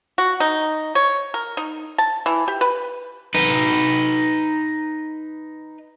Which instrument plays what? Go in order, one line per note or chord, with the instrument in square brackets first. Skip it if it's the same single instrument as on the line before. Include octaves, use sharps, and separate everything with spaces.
[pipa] F#4
D#4
C#5
A#4
D#4
A5
E3
G4
B4
[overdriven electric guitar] D#4 B4